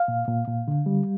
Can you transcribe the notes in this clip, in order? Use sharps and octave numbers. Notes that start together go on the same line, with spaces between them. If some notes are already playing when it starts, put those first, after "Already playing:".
Already playing: F5
A#2
A#2
A#2
D3
G3